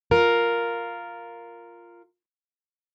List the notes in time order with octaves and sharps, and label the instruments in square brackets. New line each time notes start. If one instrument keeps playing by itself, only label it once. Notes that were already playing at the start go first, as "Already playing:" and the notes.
[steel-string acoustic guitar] F4 A#4